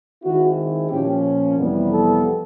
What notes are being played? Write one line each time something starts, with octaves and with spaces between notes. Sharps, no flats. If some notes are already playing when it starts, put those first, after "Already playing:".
D#3 G#3 C4 E4 F#4
A#2 F3 A#3 C#4 G4
F2 C3 E3 G3 B3
A4